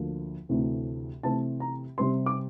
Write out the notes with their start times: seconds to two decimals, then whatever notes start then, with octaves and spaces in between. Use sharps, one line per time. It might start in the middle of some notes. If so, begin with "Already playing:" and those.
Already playing: D2 D3 F3 A#3
0.49 D2 C3 E3 A3 C4
1.23 C3 E3 A3 C4 A5
1.60 A#5
1.98 C3 G3 C4 C6
2.26 D6